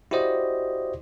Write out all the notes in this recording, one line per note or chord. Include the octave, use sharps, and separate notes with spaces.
E4 F#4 G4 C5 D5 D#5